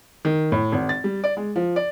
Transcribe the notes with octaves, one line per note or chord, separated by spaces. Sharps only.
D#3
A2
G#1
A6
G3
D5
G#3
F3
D5